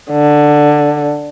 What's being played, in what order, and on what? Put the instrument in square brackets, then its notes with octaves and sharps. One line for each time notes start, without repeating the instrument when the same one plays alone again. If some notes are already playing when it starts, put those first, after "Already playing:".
[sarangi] D3